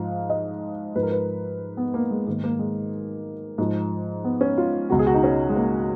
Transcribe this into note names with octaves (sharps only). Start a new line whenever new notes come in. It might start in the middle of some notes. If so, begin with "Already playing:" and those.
Already playing: G#2 F3 F5
D#5
G#2 F3 B4
A#4
B4
B3
A#3
G#3
G#2 D#3 A#3
A#3
G#3
G#2 F3
B3
C#4
F4
C#2 B2 F#4
G#4
F#4
D#4
C#4
G#3
A#3